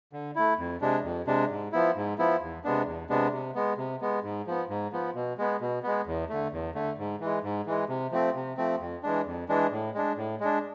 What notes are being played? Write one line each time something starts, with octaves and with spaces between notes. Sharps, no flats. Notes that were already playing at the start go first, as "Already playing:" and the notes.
D3
A3 E4
F2
C3 G#3 D4
F2
C3 G#3 D4
G#2
F3 B3 E4
G#2
F3 B3 E4
E2
C3 G#3 B3 D4
E2
C3 G#3 B3 D4
C3
G#3 B3
C3
G#3 B3
G#2
F3 B3
G#2
F3 B3
B2
G#3 B3
B2
G#3 B3
E2
D3 A3
E2
D3 A3
G#2
E3 G#3
G#2
E3 G#3
C3
F3 A3 C4
C3
F3 A3 C4
F2
E3 G#3 D4
F2
E3 G#3 D4
A2
G#3 D4
A2
G#3 D4